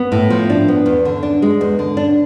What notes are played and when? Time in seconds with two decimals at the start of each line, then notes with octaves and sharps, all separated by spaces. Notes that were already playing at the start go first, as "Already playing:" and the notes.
Already playing: B3
0.12 A2
0.30 F3
0.50 D4
0.68 B3
0.86 E2
1.05 D3
1.23 D4
1.42 G#3
1.61 E2
1.79 D3
1.97 D4